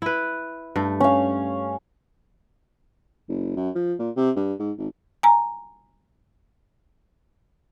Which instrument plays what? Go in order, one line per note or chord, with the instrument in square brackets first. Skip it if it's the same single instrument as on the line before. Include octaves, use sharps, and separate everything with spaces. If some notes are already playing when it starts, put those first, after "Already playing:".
[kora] E4 B4
G2 A3
[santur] C#4 F5
[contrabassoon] F#1
F#2
F3
A#2
C3
G2
G#2
G#1
[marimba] G#5 A#5